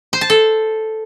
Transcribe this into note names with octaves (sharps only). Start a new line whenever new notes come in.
C5
A5
A4